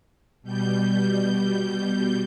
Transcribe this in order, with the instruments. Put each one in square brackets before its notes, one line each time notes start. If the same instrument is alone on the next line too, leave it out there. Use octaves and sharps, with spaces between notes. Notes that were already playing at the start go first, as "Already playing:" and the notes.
[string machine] B2 G3 G6